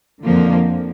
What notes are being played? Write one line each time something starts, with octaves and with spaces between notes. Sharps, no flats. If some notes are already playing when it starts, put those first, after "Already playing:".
F2 D3 F3 A#3